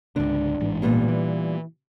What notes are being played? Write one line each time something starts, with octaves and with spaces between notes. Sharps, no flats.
C#2 G#2 D3 D4
A1 G#2 E3
A#2 G3 B3
E3